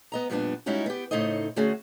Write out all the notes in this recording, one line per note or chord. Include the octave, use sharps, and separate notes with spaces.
B3 D#5 A#5
F2 A#2 G3 B3 D4
G3 G#3 C#4 D#4 E4 F#4
B3 G4
A2 C#3 D#4 A4 C5 D#5
D3 A3 C#4 F#4 G#4